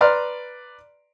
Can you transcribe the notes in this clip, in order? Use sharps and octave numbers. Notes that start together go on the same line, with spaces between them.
B4 D5 A#5 C6 F6